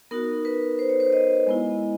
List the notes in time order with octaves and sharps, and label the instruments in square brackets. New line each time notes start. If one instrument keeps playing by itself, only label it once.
[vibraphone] B3 D#4 F#4 A#4
B4
C5
C#5
C5
D#5
G#3 B3 E4